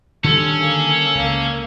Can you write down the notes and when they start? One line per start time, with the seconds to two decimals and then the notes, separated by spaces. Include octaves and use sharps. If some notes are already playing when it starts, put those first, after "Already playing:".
0.24 D3 D#3 G3 C#4 A4
0.59 A#3 G#4
1.15 C#2 A#3